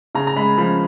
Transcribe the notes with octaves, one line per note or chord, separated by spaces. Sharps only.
C#3 A#5
A#5
G#3 B5
F3 B5